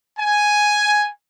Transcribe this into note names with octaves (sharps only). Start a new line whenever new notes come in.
G#5